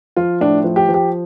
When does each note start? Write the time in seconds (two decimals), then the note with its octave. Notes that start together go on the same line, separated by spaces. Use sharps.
0.16 F3 F4
0.41 A2 D4
0.64 F3
0.76 G4
0.89 F3
0.94 G4